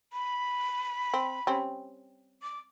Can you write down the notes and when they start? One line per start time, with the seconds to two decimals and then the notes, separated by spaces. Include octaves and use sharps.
0.13 B5
1.14 C4
1.47 G3 C4 C#4
2.42 D6